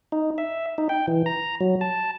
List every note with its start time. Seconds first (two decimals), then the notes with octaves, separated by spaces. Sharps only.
0.12 D#4
0.38 E5
0.78 D#4
0.89 G5
1.08 E3
1.26 A#5
1.61 F#3
1.81 A5